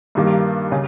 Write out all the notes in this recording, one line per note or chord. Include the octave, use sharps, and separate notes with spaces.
G2 D#3 G3 A#3
C#3